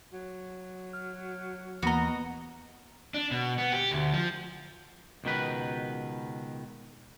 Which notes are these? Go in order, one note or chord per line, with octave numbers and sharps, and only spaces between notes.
F#3
F6
D#2 E3 A#3 B3 F#4 D#5 A#5
D4
B2
B3
G4
D2
F3
C#2 B2 D#3 B4